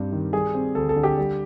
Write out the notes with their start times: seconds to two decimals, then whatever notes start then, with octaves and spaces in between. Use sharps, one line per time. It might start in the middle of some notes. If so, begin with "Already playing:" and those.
Already playing: G2 G3 C4
0.12 D#3
0.33 G3 G#4
0.54 C4
0.75 D2 A4
0.89 A4
0.96 D3
1.03 G4
1.18 G3